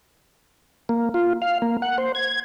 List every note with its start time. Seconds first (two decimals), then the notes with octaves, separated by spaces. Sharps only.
0.89 A#3
1.14 F4
1.42 F5
1.62 A#3
1.82 F#5
1.98 C5
2.15 G#6